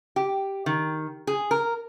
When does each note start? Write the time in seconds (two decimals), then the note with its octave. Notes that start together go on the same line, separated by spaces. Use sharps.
0.16 G4
0.66 D#3
1.27 G#4
1.51 A#4